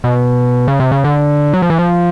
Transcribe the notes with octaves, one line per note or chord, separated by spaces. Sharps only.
B2
C#3
C3
C#3
D3
F#3
F3
E3
F3